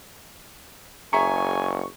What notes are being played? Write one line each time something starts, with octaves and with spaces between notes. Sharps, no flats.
F#1 G#4 E5 G#5 A#5 C#6